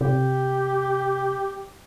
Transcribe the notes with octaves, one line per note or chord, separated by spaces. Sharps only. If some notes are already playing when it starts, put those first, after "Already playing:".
C3 G4